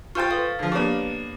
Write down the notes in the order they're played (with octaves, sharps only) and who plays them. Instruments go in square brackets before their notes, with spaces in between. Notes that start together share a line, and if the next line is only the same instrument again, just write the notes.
[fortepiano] F4 C5 G5 [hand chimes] C#6 A6
[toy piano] A4 B4 [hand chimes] F5
[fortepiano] D3 F3
[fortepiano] A#3 B3 D4 [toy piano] G4 C#5